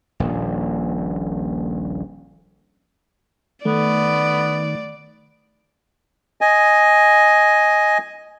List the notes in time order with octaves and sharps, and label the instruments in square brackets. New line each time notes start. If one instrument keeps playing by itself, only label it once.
[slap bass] D#1 A#1
[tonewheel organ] D#3 [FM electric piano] A3 [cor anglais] B3 [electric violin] D5
[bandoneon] D#5 G#5